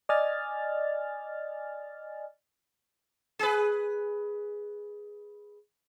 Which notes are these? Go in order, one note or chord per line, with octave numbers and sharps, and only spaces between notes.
D5 D#5 G#5 F6 A6
G#4 B4